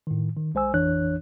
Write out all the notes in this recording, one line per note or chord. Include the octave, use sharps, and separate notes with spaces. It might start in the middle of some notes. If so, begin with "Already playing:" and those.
A2 D#3
D#3
B1 G#3 C5 G#5 E6
A1 F2 E3 D4 C#5 F#6